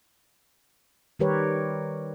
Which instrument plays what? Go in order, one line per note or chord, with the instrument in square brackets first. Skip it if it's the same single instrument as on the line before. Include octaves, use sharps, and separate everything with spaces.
[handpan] D#3 G3 G4 A#4 B4 C#5